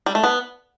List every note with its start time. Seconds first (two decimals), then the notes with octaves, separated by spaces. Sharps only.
0.06 G3
0.15 A3
0.24 B3